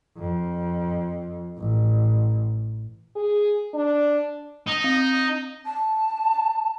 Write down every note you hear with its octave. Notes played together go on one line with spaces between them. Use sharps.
F2
A1
G#4
D4
D#4
C4
A5